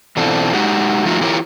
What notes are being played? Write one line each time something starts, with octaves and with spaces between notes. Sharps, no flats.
B2 E3 C4 D4 F4 A4
G#3 D#4 F#4 G4
F3 A3 D#4 F4 F#4
E3 E4 F4 G4 A#4 C#5